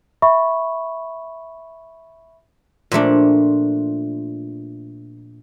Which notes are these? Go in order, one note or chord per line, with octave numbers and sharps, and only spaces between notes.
E5 B5 C#6
A#2 F3 A3 D4